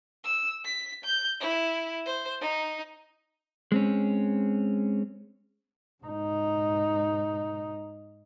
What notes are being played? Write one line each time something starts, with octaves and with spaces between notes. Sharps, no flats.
E6
B6
G6
E4
C5
D#4
G#3 C4 C#4
G#2 D#4